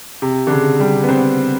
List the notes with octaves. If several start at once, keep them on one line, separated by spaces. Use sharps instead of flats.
C3
D3
C#3
G3
B3
C4